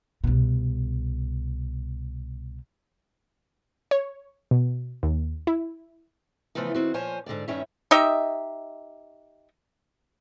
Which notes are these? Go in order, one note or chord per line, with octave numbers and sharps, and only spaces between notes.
C2 B2
C#5
B2
D#2
E4
C#3 E3 F3 A3 B3 D#4
D#3 C4 F#4
A#2 F3 C5 C#5 G#5
G#2 D3 F#3 D5
G2 D#3 C#4 C#5 E5
D#4 G4 D#5 E5